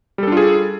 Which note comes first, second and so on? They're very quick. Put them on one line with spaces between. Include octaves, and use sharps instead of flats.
G3 A4 D4 F4 G#4